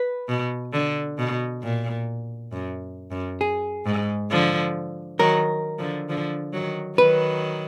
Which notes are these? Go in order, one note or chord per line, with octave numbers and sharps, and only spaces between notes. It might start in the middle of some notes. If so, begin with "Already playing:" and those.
Already playing: B4
B2
D3
B2
A#2
F#2
F#2
G#4
G#2
D3 F3
D#3 F#3 A#4
D3 F3
D3 F3
D#3 F#3
D#3 F#3 B4